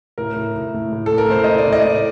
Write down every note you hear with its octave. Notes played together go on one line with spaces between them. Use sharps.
A2 A#4
A2
A2
A2
A2
A4
A2
A#4
A2 C5
D#5
A2
D5
A2 D#5
A2